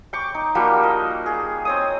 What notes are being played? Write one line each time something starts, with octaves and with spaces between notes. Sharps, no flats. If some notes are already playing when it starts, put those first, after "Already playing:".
G5 C#6 D6
D#4
F3 G3 A#3 F#4
D#5
G#4
C4 C#5 D#6